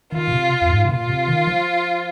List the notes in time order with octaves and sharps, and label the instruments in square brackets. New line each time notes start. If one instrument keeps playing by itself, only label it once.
[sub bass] D#3 [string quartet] F4
[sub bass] A#2
C3
F2
G#2
C3
[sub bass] A#2 [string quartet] F4
[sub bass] C3
D#3
F3